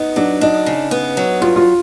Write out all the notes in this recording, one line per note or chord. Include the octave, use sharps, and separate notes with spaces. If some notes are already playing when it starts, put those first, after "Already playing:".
Already playing: B3 D#4
F#3 D4
D4 D#4
C#3
B3
F#3
G2 F4
F4